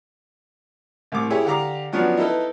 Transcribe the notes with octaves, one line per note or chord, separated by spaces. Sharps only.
C2 A2 D6
E4 G4 G#4 C#5
D3 G4 F5 A#5 D6
F3 F#3 B3 C#4 D4
D#4 E4 A4 B4